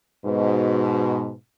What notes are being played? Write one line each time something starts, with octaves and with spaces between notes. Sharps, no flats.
G#2 B2